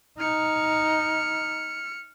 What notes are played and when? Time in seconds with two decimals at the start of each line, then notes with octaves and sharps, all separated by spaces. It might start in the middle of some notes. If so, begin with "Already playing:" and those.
0.19 D#4 F6 C#7